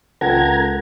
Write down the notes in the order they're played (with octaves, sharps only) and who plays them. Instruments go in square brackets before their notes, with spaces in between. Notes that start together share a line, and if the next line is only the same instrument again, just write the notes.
[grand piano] C#2 F4 G5 [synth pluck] A4 A#4 F#5 [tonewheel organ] A#5 G#6